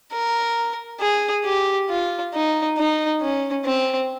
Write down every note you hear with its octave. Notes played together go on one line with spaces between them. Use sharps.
A#4
G#4
G4
F4
D#4
D#4
C#4
C4